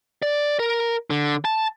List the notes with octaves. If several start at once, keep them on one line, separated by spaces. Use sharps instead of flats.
D5
A#4
D3
A5